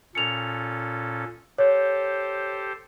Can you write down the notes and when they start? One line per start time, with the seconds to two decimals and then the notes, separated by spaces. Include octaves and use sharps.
0.15 A#2 C#4 A4 C#7 F7
1.58 G4 A4 C5 C#5